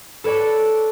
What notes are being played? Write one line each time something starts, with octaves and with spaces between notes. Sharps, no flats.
A4 B4 C#5 D5 A5